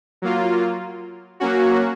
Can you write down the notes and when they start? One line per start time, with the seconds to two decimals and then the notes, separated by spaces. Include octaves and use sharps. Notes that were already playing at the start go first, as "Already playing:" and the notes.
0.22 F#3 A#3 F4
1.40 F#3 A#3 C#4 F#4